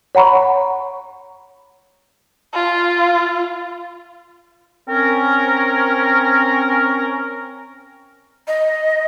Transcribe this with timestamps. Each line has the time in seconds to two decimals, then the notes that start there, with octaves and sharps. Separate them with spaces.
0.15 C#5 F#5 A#5 B5 C#6
2.54 F4
4.88 C4 C#4 A#4
8.47 D#5